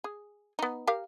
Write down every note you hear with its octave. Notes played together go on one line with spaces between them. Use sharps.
G#4
B3 D#4
G4 A#4 F5